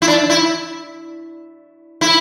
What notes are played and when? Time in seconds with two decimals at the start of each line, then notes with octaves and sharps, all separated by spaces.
0.02 E4
0.08 D4
0.30 E4
2.01 E4